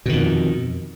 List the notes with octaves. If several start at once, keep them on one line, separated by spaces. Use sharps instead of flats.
F2 B2 D#3